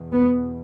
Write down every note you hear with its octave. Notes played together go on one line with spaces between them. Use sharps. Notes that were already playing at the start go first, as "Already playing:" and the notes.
Already playing: E2 B2
B3